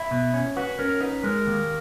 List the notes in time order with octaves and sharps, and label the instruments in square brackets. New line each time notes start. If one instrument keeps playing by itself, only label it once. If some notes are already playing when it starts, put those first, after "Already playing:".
Already playing: [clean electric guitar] E4
B2
C#4
[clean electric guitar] F#4 [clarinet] B4
[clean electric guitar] C#4 [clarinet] A#4
[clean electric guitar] D#4 [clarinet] B4
[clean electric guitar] G#3 [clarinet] A#4
[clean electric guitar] D#2